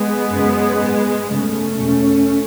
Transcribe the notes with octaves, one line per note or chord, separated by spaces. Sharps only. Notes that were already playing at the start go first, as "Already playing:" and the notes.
Already playing: G#3 B3
F#2 C#3
G#2
F#2 C#3 A3 C#4
E2 B2